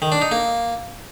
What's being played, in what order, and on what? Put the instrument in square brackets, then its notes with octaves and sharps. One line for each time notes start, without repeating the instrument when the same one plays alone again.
[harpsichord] D#3
D4
D#4
A#3